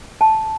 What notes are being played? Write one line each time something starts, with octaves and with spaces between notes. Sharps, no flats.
A5